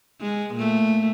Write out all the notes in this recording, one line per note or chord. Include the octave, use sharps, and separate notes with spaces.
G#3
A#2 A3